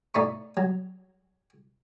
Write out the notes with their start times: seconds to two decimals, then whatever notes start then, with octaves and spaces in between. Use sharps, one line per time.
0.14 A2 D#4 D5 B5 C#6
0.57 F#3